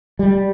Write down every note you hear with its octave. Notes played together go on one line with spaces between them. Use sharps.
G3